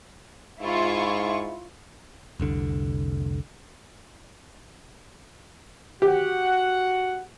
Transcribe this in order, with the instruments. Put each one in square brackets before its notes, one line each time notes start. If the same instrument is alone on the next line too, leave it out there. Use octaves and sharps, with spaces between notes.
[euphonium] G#2 [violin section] E4 F4 C#6
[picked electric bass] F1 C2 D3
[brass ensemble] F#4 F#5 [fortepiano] G4